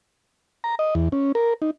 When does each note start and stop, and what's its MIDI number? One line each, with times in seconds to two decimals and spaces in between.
0.64 0.75 82
0.79 0.94 75
0.95 1.08 40
1.12 1.32 61
1.35 1.54 70
1.62 1.71 63